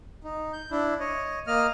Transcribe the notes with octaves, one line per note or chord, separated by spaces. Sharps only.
D#4
G6
D4 E4
C#5 D#5
A#3 D#5 F6